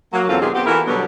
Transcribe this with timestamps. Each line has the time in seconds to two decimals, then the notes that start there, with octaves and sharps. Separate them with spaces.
0.13 F#3 A#3
0.28 E2 D3 C4 C#4 F4 A4
0.41 B2 D#3 F4 G4 G#4
0.54 B3 C4 G4
0.66 E3 A#3 E4 F#4 A4 A#4
0.86 B2 D3 F#3 G3 B3